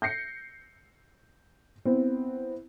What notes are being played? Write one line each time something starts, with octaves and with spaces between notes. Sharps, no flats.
G6 A#6 C7 C#7
B3 C4 E4